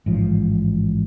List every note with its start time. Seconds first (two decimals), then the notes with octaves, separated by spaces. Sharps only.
0.06 A1 G#2 F3